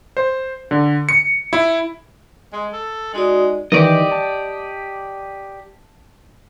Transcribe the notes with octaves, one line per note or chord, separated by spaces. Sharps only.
C5
D3
C#7
E4
G#3
A4
G#3 D#4 F#4 D5
D#3 E3 G4 D5 D#5
A5